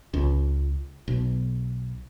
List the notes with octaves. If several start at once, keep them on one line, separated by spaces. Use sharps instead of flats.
C#2
B1